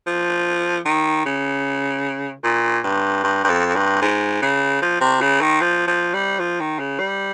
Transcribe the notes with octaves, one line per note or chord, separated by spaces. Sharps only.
F3
D#3
C#3
A#2
G2
G2
G2
F2
G2
G#2
C#3
F3
C3
C#3
D#3
F3
F3
G3
F3
D#3
C#3
G3